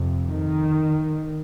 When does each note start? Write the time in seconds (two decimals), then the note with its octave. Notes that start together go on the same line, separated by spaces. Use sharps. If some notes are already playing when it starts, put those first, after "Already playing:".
Already playing: F2 C3
0.27 D#3